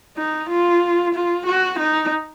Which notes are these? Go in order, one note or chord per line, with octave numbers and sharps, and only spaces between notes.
D#4
F4
F4
F#4
D#4